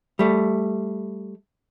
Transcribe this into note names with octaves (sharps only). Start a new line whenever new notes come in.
G3 A3